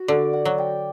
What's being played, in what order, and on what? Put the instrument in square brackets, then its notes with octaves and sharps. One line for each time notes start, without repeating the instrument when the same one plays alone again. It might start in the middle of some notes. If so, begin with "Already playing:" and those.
Already playing: [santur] F#4
[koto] D3 [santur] D5
[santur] F#5
[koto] F#3
[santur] G5